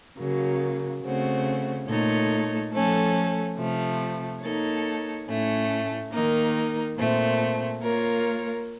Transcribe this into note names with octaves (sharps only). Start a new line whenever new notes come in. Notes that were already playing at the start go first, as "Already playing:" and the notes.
C#3 F#3 A#3
C#3 A3 C4 F#4
A#2 A3 D#4 A4 C#5
F3 A3 C#4 A4
C3 F3 A3
A#3 D#4 A4 C#5
A2 A3 C#4
D#3 A#3 D#4 A#4
A#2 A3 C4
A#3 F4 A#4 C#5